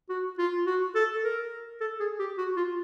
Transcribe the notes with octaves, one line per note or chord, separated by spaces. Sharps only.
F#4
F4
F#4
A4
A#4
A4
G#4
G4
F#4
F4